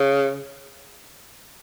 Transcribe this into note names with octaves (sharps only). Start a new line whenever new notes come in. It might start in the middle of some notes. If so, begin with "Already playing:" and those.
Already playing: C#3